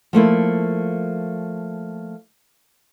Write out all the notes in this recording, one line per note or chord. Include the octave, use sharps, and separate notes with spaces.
F3 A3 A#3 E4